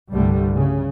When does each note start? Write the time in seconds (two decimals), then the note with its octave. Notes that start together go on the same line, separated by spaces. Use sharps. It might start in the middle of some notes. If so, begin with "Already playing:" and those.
0.11 C2 G2 D3 G3 A3
0.54 C#3